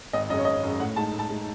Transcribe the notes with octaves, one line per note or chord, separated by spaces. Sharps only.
G#1 D#5
F#2 C#3 D#5
C#5
G#1 D#5
F#2 C#3
A2 F#5
G#3 D#4 A5
A2
A5
G#3 D#4